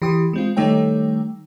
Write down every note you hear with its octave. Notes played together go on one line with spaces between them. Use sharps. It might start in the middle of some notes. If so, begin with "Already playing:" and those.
E3 G4 C6 D#6
G#3 C4 F4
D#3 G3 A3 D#4 C#5 G5